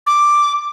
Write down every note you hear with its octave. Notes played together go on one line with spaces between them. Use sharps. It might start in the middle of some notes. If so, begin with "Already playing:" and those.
D6